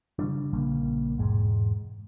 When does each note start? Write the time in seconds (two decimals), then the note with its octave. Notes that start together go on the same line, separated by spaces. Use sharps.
0.19 C#3 G3 D4
0.53 A#1 C#3 G3 A#3
1.18 E1 G#2 G#3